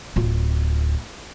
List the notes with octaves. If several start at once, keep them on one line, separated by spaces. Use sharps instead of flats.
D1 F4